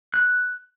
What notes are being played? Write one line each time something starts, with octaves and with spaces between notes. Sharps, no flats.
F#6